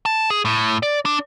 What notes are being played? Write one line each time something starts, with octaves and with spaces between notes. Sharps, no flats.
A5
G#4
A2
D5
D4